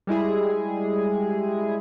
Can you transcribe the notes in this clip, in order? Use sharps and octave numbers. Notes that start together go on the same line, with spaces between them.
G3 G#3 E4 G#4